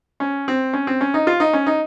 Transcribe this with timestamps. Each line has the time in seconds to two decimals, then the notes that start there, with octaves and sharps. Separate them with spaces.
0.20 C#4
0.48 C4
0.73 C#4
0.87 C4
1.01 C#4
1.14 D#4
1.27 F4
1.40 D#4
1.53 C#4
1.66 D#4